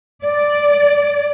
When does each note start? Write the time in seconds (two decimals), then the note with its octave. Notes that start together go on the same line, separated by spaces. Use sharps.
0.24 D5